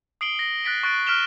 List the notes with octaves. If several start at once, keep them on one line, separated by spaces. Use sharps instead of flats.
D#6 C7 D7 F#7 G7
A#6
F#6 A6 B6 D7
C#6 F#6 A6 D7
F6 B6 D7 E7 F7 G7